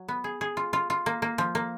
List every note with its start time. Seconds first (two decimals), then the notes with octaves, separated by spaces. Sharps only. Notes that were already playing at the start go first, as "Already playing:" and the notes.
Already playing: F#3
0.08 B3
0.24 G#4
0.41 G#4
0.57 F4
0.73 F4
0.90 F4
1.06 A#3
1.22 A#3
1.38 F3
1.55 A#3